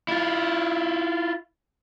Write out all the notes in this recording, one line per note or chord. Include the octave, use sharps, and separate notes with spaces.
E4 F4